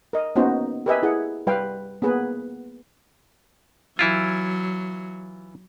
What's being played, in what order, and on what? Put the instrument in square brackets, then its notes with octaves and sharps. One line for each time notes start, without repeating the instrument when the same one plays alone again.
[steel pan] A#4 D#5
A#3 B3 C#4 D#4 F#4 C5
G4 A#4 B4 D#5 E5 G#5
E4 G#4 F#5
G3 B4 F5 G5
A#3 B3 G#4 B4
[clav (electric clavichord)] E3 E4 F4 [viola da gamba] F#3